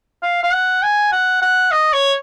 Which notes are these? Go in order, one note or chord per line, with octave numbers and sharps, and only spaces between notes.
F5
F5
F#5
G#5
F#5
F#5
D#5
C#5